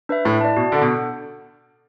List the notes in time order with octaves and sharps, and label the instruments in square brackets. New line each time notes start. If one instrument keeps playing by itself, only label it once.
[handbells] D4 B4 E5
[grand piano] A2 [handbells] E4
[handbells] D5 A5
[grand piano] B2 [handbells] F#4
[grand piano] D3 [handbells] A4 F#5
[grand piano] B2
[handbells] D4